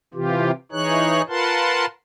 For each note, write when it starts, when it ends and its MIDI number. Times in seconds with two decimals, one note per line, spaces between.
0.14 0.51 48
0.14 0.51 52
0.14 0.51 65
0.14 0.51 67
0.72 1.22 52
0.72 1.22 63
0.72 1.22 68
0.72 1.22 73
0.72 1.22 90
1.29 1.86 65
1.29 1.86 70
1.29 1.86 71
1.29 1.86 78
1.29 1.86 81
1.29 1.86 84